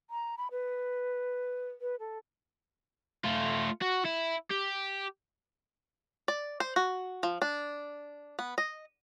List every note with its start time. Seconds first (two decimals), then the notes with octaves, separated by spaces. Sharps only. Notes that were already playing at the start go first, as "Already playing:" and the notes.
0.10 A#5
0.38 B5
0.51 B4
1.81 B4
2.00 A4
3.24 A3 F4
3.82 F#4
4.05 E4
4.51 G4
6.28 D5
6.60 C5
6.76 F#4
7.23 F3
7.42 D4
8.39 B3
8.58 D#5